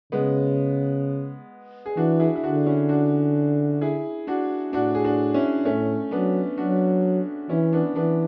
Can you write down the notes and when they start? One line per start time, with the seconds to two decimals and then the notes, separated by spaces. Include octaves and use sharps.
0.12 C#3 G#3 B3
1.86 G#4
1.97 E3 D4 F#4
2.20 E4 G#4
2.36 E4
2.43 D3 D4 F#4
2.66 C#4 E4
2.89 D4 F#4
3.81 E4 G#4
4.27 D4 F#4
4.73 A2 D4 F#4
4.95 G#4
5.04 D4 F#4
5.34 C#4 E4
5.65 A2 A3 C#4
6.11 F#3 B3 D4
6.57 F#3 D4 F#4
7.49 E3 C#4 E4
7.72 B3 D4
7.95 E3 B3 D4